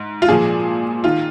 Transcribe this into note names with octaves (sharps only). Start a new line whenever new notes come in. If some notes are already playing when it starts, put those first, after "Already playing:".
Already playing: G#2
F4
A#2 F3 G#4
D#3 F4